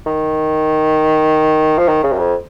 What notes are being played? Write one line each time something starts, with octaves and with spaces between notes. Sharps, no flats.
D#3
F3
D#3
C#3
F#2
F2